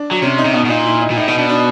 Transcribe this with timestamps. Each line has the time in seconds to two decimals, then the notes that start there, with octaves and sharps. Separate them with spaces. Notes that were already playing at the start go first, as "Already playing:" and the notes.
Already playing: D4
0.11 F#3
0.22 C3 C#4
0.38 D#4
0.45 C3
0.53 B2 D#4
0.65 B2
0.69 A#2 D#4
0.86 E4
1.02 D#4
1.10 A#2
1.17 A2 D#4
1.28 B2 D#4
1.38 B2 D4
1.49 D4